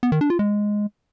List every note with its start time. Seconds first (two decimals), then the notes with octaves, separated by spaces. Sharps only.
0.03 B3
0.12 D#3
0.21 D4
0.30 F4
0.39 G#3